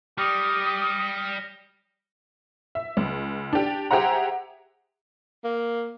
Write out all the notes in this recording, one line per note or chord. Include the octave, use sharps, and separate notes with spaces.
G3 G4 D#6 F6 A#6 C#7
E5
C#2
D4 G4
G4 G#4 C5 E5 F#5 A#5
A#3